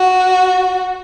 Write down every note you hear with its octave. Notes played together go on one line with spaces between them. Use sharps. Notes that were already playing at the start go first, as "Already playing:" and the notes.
Already playing: F#4